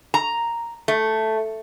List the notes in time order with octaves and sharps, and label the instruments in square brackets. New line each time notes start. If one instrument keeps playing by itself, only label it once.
[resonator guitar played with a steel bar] A#5
A3